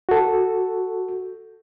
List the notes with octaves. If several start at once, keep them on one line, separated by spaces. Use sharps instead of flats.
F#4 A4